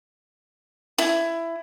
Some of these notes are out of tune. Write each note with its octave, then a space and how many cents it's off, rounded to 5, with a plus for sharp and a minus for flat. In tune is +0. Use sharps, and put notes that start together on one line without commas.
E4 +15